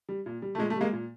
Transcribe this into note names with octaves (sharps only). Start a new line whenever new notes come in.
G3
A#2
G3
A3
A#2 G#3
A3
G3 G#3 A#3
A#2